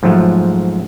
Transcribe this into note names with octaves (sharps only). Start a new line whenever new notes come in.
G#2 F3 F#3 A3